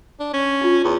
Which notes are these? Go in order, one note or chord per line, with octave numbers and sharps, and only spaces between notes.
D4
C#4
D#4 F4
E2